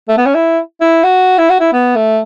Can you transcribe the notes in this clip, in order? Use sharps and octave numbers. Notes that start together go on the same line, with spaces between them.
A3
B3
C#4
E4
E4
F#4
E4
F#4
E4
B3
A3